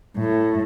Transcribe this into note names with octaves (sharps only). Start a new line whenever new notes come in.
A2